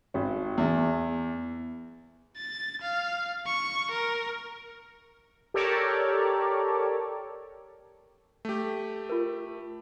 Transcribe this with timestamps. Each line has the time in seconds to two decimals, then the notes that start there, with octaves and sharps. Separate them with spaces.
0.14 G#1
0.58 E2
2.37 A6
2.81 F5
3.46 C#6
3.90 A#4
5.54 G4 A4 A#4 C#5 D5
8.45 A3 G4
9.10 F4 A#4